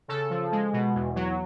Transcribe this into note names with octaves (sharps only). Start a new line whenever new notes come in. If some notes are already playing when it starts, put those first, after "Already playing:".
C#3 A4
F3
G#3
B2
E2
F#3